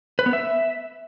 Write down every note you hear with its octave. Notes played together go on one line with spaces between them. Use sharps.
B4
B3
E5